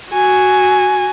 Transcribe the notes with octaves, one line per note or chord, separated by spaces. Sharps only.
F#4 G#5